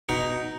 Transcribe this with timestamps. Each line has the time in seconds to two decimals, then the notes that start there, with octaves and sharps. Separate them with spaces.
0.09 B2 D#4